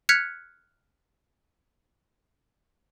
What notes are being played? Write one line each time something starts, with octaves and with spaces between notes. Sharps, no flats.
F6 F#6 G#6 B6 C#7 F7